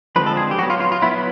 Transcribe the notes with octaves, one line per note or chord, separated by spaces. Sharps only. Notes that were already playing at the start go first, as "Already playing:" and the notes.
D3 F3 G#3 C4 B4
A4
G#4
G4
F#3 B3 F#4
F4
F4
F4
F#3 B3 E4